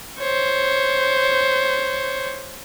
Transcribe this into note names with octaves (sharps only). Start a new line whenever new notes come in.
C5 C#5